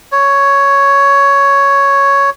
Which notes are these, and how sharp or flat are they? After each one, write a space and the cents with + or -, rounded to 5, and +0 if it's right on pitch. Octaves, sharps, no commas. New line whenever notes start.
C#5 +5